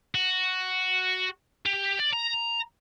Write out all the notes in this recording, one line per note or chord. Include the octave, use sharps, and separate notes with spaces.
F#4
G4
D5
A#5